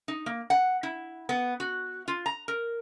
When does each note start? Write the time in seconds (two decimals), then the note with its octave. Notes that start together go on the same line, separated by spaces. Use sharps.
0.08 D#4
0.26 A#3
0.50 F#5
0.83 E4
1.29 B3
1.60 F#4
2.08 F4
2.26 A#5
2.48 A#4